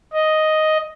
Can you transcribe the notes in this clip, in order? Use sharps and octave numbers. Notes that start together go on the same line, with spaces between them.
D#5